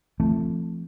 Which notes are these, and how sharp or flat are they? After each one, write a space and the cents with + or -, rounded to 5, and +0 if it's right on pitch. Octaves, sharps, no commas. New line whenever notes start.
F3 -40 A3 +0 C4 +0